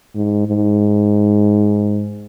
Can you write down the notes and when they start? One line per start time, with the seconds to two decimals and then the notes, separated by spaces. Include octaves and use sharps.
0.15 G#2
0.47 G#2